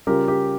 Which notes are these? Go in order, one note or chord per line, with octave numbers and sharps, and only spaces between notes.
C#3 G3 C#4 F4 G4 A#4
G4